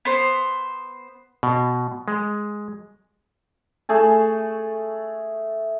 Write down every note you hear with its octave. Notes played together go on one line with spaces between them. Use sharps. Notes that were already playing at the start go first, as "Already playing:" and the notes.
B3 C5
B2
G#3
A3 G#4 A4